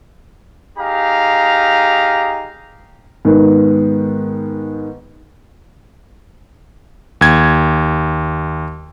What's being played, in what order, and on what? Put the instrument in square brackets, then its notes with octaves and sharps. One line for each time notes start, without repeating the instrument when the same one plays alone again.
[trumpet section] D#4 G4 G#4 F5 A#5
[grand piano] G#2 D#3 B3
[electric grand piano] D#2 G#6